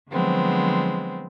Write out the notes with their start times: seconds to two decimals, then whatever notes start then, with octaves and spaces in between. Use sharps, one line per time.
0.11 D3 F3 F#3 G#3 B3 C4